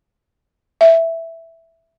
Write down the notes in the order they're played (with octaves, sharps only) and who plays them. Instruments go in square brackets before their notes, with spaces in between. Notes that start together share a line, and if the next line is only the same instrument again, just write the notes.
[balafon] E5